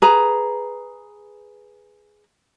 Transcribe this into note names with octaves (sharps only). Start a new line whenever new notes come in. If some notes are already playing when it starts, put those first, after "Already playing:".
G#4 B4 A#5